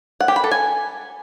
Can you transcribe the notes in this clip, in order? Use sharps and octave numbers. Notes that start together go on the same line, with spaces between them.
F#5
G4
B5
A4
G#5